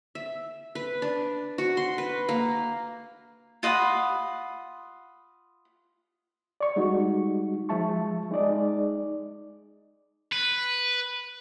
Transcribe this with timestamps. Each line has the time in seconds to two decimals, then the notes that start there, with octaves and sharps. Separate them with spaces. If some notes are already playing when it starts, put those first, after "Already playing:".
0.15 E5
0.75 B4
1.02 D4
1.58 F#4
1.77 C6
1.98 B4
2.29 A#3
3.63 F4 D#5 F#5 B5
6.61 D5 C#6
6.76 G3 G#3 D#4 F#4
7.69 F3 G#3 E5 A5 C#6
8.31 G#3 D#4 G#4 D5 D#5
10.33 B4